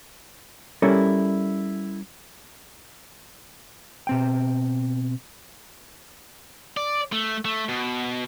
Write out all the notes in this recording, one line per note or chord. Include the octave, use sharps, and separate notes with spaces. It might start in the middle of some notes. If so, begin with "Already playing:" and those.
G3 C#4 E4 A4 A#4 D5
B2 C4 G5
D5
A3
A3
B2